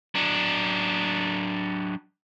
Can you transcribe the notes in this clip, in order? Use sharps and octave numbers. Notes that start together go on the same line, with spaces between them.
F#3 D4